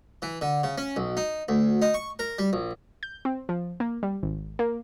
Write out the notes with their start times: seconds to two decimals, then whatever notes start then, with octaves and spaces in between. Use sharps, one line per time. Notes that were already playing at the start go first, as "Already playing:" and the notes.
0.22 E3
0.41 D3
0.63 C#3
0.78 C#4
0.96 B1
1.17 D#4
1.49 D2
1.82 D#4
1.94 C#6
2.19 A#4
2.39 G3
2.53 A#1
3.03 G6
3.25 C4
3.49 F3
3.80 A#3
4.03 G3
4.23 G#1
4.59 A#3